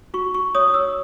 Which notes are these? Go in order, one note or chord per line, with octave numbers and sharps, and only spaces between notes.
F#4 C#6
C#6
C#5 D#6
E6